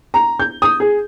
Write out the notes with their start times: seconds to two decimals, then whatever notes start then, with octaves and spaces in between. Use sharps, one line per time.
0.14 A#5
0.40 G6
0.62 D#6
0.80 G#4